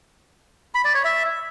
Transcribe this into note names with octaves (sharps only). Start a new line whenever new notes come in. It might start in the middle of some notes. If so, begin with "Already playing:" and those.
B5
D5
C#5
E5